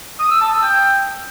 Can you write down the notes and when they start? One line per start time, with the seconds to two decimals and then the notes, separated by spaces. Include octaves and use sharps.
0.20 D#6
0.30 E6
0.41 A5
0.52 E6
0.63 G5